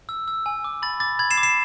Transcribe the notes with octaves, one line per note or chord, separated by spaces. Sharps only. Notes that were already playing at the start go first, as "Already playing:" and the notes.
E6
E6
G#5
D6
B5 A6
D6 A6
B5 G#6
C7 E7
D6
C7 E7